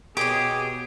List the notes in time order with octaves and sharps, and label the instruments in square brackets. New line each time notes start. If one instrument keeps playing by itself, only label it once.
[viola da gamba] B2 B3 [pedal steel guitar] G4 [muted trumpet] G#4 [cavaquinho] C#5 D#5 D6